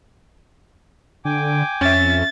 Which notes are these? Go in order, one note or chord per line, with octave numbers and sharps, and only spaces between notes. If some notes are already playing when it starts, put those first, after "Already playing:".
D3 G5 G#5 D6
F2 C#4 E5 A6